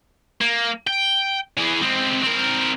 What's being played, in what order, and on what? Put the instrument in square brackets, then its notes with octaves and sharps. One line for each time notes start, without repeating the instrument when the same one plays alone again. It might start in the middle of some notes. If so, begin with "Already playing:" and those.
[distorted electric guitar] A#3
G5
E3 G#4
G#3 C4
C4 A#4